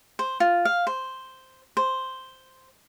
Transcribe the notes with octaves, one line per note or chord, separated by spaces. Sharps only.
C5
F4
F5
C5
C5